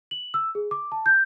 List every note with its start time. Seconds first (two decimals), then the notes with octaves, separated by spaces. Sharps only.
0.11 F#7
0.34 E6
0.55 G#4
0.71 D6
0.92 A5
1.06 G6